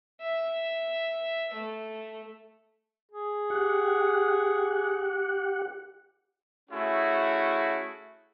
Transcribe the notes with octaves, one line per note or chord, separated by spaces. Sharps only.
E5
A3
G#4
G4 F#5
A3 C#4 E4 F#4 G#4